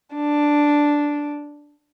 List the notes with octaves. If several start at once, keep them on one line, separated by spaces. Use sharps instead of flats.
D4